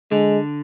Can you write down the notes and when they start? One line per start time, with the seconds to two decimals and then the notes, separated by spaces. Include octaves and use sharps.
0.11 D3 G#3